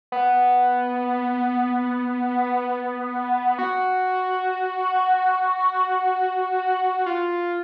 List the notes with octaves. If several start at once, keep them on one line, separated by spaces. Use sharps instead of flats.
B3
F#4
F4